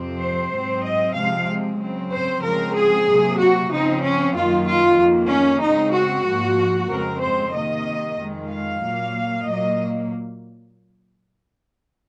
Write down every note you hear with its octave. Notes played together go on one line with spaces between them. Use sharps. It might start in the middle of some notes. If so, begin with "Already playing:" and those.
Already playing: F2 C3 F3 C4
C5
G#2 F#3 C4
D#5
C3 F3 G#3 C4 F5
C#3 F#3 C4
C5
C#3 F3 G#3 C4 A#4
G#4
C3 F#3 A#3
F#4
C#3 F3 C4 D#4
C#4
F#2 D#3 A#3 F4
F4
F2 D#3 A#3
C#4
C#3 G#3 C4 D#4
F#4
G#2 F3 A#3
F2 C#3 G#3 C4 A#4
C5
C3 D#3 A#3 D#5
F2 D#3 G#3
F5
A#2 F#3 A#3
A#2 F#3 A#3 D#5